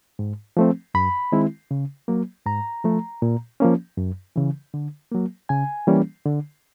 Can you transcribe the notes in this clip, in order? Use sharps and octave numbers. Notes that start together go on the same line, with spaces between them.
G#2
F3 A3 C4
F#2 B5
D#3 G#3 C4 E4
C#3
F#3 A#3
G#2 A#5
F3 A3
A#2
F3 A#3 C#4
F#2
C#3 E3
D3
F#3 A#3
C#3 G#5
E3 G3 A#3 C#4
D3